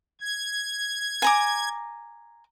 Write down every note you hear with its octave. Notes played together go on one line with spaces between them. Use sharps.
G#6
G#5 A#5 D6